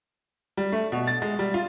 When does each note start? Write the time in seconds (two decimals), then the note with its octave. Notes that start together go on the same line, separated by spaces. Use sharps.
0.57 G3
0.72 A3
0.92 B2
1.07 A6
1.22 G#3
1.39 G3
1.54 F4